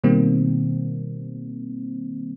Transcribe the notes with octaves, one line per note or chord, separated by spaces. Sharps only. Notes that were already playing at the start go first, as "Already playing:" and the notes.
B2 D#3 G3 A#3 C4